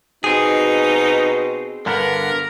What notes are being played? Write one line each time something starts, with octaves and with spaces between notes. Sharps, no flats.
B2 C4 D#4 G#4
G2 D3 B3 A#4